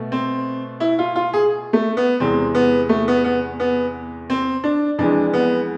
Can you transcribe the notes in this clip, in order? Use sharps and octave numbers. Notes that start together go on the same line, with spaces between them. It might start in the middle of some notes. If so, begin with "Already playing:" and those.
Already playing: B2 A3
C4
E4
F4
F4
G#4
A3
B3
E2 C3 G#3 C4
B3
A3
B3
B3
B3
C4
D4
F2 E3 G#3 D4
B3